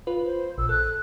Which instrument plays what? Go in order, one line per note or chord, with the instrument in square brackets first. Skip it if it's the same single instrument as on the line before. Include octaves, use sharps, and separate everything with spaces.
[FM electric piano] F4 B4
[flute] C5
[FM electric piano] A#1 [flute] E6
[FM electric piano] A4 [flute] F#6